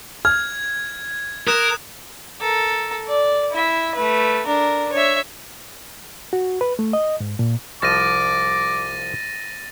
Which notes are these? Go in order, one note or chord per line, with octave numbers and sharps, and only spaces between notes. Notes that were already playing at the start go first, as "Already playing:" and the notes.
F6 G#6
A#4 D#6 F#6 E7
A4 A#4
D5
E4 E5
A3 B4
D4 A#4
C#5 E5
F#4
B4
A3
D#5
G#2
A#2
C2 F3 A5 D6 A6 A#6 D#7